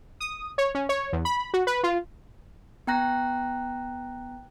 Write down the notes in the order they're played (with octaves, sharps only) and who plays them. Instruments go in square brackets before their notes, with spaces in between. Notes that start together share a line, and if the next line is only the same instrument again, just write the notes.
[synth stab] D#6
C#5
C#4
C#5
E2
B5
F#4
B4
F4
[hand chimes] B3 G5 A#5 F#6 A#6